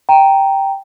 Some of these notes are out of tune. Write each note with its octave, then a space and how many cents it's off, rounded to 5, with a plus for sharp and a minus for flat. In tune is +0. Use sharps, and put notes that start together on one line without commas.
G5 +0 A#5 +0